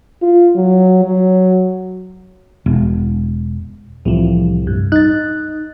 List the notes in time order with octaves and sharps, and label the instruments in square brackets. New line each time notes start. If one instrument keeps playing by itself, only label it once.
[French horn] F4
F#3
F#3
[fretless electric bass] E1
[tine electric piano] C2 A2 C3 [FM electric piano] E3 F3
[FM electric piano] G2
[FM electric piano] D#4 [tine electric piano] F#6 A6